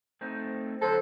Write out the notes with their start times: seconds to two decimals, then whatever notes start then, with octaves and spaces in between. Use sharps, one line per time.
0.21 A3 C4 D#4
0.82 D3 F#3 D#4 A4 C5